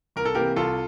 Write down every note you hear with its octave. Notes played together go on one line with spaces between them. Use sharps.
C2 A#4
A4
C3 E3 A#3 G4 A#4
C2 F4 A4